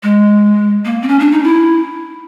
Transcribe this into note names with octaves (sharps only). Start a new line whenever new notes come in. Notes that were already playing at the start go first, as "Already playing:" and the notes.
G#3
A#3
C4
C#4
D4
D#4
E4